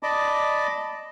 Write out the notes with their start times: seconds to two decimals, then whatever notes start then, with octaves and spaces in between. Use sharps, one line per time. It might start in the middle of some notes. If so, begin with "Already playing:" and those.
0.03 D5 D#5 A5 B5 D6